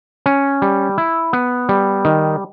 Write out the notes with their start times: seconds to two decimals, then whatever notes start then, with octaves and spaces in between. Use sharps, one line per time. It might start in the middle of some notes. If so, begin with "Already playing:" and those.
0.26 C#4
0.62 G3
0.98 E4
1.33 B3
1.69 G3
2.05 D#3